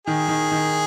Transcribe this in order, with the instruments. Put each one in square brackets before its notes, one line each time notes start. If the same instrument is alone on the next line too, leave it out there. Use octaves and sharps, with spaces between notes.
[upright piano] D#3 [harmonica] G#4
[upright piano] D#3
D#3